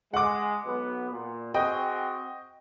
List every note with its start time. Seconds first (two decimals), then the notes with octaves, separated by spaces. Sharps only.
0.14 G#3 F#5 D6
0.65 B1 B3
1.11 A#2
1.54 C4 F#4 G#4 D#5 G5